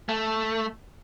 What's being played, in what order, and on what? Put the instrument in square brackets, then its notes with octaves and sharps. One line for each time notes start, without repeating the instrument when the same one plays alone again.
[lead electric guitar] A3